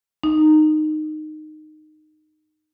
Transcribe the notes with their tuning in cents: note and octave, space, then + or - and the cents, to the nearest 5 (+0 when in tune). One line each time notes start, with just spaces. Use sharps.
D#4 -15